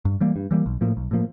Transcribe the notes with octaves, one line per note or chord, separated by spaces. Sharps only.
G2
E3 G3 A#3
G2
E3 G3 A#3
B1
A2 F3 A#3
B1
A2 F3 A#3